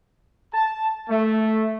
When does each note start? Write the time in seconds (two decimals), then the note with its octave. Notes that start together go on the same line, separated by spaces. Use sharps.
0.53 A5
1.09 A3